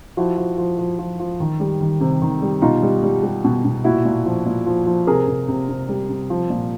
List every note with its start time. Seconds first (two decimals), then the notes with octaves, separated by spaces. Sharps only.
0.17 F3 E4 F#4
0.37 F3
0.58 F3
0.79 F3
0.99 F3
1.19 F3
1.40 D#3
1.60 G3
1.81 D#3
2.01 C3
2.21 D#3
2.42 G3
2.62 B2 D#4 F4
2.83 G3
3.03 G3
3.23 G3
3.44 B2
3.65 B2
3.84 A#2 E4 F#4
4.05 A#2
4.26 F3
4.46 A#2
4.67 F3
4.86 F3
5.07 C3 G#4 A#4
5.28 C3
5.48 C3
5.69 C3
5.89 G3
6.09 C3
6.30 F3
6.50 A#2